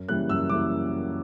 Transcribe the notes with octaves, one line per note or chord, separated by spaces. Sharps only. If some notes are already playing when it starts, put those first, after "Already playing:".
Already playing: F#2
C#3 E3 G3 A#3 F#6
F#2 E6
C#3 E3 G3 A#3 D6